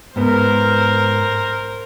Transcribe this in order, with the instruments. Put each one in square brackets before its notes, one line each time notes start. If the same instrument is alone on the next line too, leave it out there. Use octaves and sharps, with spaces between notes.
[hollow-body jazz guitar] G#2 B3 [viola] A#4 C5